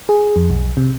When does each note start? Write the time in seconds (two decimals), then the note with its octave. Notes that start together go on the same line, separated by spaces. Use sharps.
0.09 G#4
0.36 F2
0.50 B1
0.77 C3